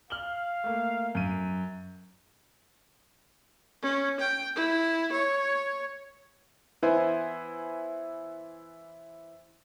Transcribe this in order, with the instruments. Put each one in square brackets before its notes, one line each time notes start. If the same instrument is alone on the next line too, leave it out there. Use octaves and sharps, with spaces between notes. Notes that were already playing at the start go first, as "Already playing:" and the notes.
[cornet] F5 [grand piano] F6 F#7 G7
[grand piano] A3 A#3
F#2 D#7
[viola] C#4
G5
E4
C#5
[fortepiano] E3 B3 E4 C5 G#5